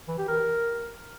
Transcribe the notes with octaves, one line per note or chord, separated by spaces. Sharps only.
E3
G4
A#4